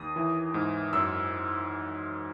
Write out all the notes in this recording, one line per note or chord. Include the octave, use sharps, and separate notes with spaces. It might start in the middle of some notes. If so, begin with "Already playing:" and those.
Already playing: D#2 D#6
E3
G#2
F#2 E6